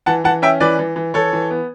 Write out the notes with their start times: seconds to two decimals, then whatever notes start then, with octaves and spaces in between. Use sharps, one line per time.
0.06 E3 F#5 A5
0.24 E3 F#5 A5
0.42 C#4 E5 G5
0.60 E3 B4 D5
0.79 E3
0.96 E3
1.14 E3 A4 C#5
1.33 E3
1.51 B3